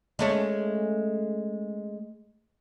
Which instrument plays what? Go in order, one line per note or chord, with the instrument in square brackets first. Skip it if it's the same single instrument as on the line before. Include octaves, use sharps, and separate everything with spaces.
[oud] G#3 A3 C#4